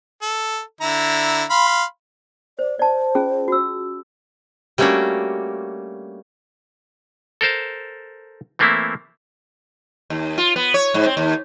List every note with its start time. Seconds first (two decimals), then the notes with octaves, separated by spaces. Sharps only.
0.22 A4
0.81 D3 E4 A#5
1.50 F5 B5 C6
2.59 C5 D5
2.79 C5 D5 A5
3.15 C#4 F4 G#4
3.48 F#4 E6
4.78 G3 A3 A#3 C#4 D4 F#4
7.41 A4 A#4 C5 A5
8.59 E3 A3 A#3 C4 E4
10.10 D#2
10.38 F4
10.56 B3
10.74 C#5
10.94 G#2
11.06 C4
11.17 D#2